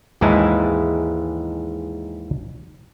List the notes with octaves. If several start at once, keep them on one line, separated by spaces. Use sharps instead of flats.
D#2 G#2 E3 G#3 E4 A5